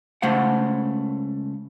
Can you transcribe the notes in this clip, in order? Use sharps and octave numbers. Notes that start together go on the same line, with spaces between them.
C#2 C#3 A3 C5 F5 F#5